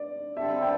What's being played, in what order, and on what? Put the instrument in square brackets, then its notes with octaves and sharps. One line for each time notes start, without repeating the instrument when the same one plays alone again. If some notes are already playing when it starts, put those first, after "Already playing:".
Already playing: [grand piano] D5
[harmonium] D3 G3 C4 A4 [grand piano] E5
[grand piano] G5